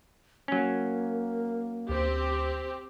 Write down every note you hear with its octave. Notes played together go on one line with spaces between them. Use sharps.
F#3 A#3 C#4
D2 C4 G4 C5